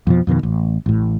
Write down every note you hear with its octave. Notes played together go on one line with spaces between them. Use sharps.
F2 B2 F3
F2 B2 D3 D#3
A1
A1 A2